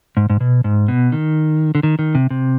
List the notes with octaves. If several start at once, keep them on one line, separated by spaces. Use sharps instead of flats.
G#2
G#2
B2
G#2
B2
D#3
D3
D#3
D#3
C3
C3